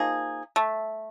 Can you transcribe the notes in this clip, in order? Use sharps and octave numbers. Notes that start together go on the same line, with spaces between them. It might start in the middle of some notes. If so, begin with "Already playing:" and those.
Already playing: F3 A#3 D#4 G#4
A3